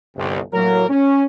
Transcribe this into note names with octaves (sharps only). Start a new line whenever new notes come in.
G1 C2
A2 F#3 A#3 A#4
C#4